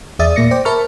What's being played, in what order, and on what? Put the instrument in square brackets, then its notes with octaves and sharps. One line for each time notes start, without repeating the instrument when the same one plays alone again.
[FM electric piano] E2 G#4 D5 E5 D#6 A6
A#2 A#3 D5 A#6 C#7
C5 G5 D6
A#4 E5 A5 B5 C#6 F6